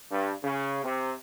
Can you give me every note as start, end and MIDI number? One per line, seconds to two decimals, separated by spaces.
0.11 0.32 43
0.43 0.82 49
0.84 1.13 48